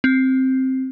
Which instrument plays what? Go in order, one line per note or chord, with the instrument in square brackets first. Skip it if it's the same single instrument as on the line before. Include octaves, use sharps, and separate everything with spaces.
[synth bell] C4